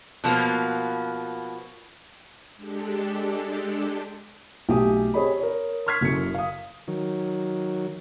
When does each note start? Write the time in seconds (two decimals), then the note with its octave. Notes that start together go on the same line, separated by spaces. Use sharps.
0.24 B2 F3 A#3 B3
2.56 G#3 D4 G4 A4
4.69 B1 A3 G4 G#5 D#6
5.14 C4 G4 G#4 C#5 D#5 B5
5.39 A#4 C#5
5.87 C6 C#6 F6 G#6 B6 C7
6.01 F#1 F#2 A4 C#7
6.35 F5 D#6
6.88 D#3 F#3